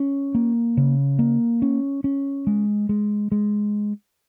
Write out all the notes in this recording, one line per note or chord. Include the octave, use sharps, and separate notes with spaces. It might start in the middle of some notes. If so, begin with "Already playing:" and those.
Already playing: C#4
A#3
C#3
A#3
C#4
C#4
G#3
G#3
G#3